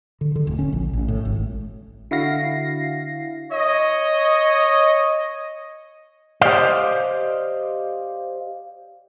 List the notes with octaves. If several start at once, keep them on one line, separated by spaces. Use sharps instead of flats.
D3
D3
D1
C#4
A#1
A1
A2
G#1
D3 E4 F#4 F5 A#6 C7
C#5 D#5
G4 C5 D5 D#5 F5